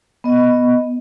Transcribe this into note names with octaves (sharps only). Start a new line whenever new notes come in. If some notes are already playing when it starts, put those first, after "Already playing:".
B3 D#5